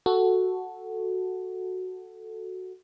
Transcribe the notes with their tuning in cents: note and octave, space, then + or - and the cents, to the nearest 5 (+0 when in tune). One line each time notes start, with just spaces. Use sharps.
F#4 +0 A4 +0